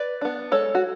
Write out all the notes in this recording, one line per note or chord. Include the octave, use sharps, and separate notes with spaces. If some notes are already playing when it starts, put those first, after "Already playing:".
Already playing: B4 D5
B3 D4
G#3 A4 C#5
F#4